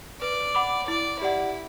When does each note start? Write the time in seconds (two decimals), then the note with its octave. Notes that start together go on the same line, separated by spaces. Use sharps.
0.21 B4 D5
0.55 F#5 B5 D6
0.87 E4 D5
1.21 E4 G4 D5 F#5